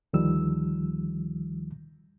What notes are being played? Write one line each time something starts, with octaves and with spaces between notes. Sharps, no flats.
D2 D#3 F3 G3 E6